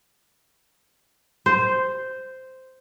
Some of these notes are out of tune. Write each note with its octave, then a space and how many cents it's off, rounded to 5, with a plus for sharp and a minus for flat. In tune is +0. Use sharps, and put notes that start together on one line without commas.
C5 -5